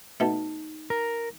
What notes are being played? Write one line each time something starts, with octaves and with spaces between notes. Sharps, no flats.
B2 A3 D#4 A5
A#4